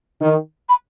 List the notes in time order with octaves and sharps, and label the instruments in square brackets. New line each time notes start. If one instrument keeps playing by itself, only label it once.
[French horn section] D#3
[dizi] B5